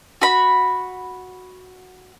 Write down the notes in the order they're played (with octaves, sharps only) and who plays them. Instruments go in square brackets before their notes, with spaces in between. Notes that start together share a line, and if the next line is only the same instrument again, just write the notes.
[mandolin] F#4 B5